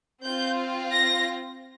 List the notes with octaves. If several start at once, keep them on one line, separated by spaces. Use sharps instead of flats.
C4 F4 G6
A#6